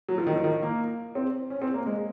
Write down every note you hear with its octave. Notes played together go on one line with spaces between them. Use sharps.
F#3
F3
D#3
F3
D#3
A#3
C4
C#4
C4
A#3
G#3